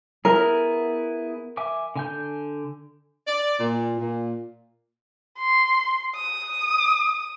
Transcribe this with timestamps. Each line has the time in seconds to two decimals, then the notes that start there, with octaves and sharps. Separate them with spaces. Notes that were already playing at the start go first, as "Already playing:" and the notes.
0.25 B3 E4 G#4 A#4
1.57 E5 G#5 D6
1.96 D3 G#5 G6
3.27 D5
3.59 A#2
3.98 A#2
5.38 C6
6.16 D#6